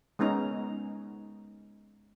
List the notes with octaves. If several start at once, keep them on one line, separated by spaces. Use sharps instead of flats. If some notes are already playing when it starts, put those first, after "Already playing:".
G#3 B3 C#4 D#4 A#5